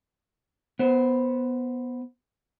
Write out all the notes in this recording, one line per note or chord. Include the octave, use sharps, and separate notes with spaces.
B3 C5